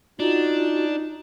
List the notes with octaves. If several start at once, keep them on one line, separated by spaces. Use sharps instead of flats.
D4 D#4 F4 F#4